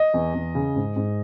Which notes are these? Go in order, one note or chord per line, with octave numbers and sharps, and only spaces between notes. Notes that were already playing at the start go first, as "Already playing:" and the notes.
Already playing: D#5
E2
E2
C#3
G#2
G#2